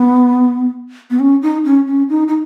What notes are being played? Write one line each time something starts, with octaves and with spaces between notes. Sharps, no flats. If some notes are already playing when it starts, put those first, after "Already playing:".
Already playing: B3
B3
C#4
D#4
C#4
C#4
D#4
D#4